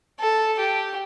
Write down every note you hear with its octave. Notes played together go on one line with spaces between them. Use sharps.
A4
G4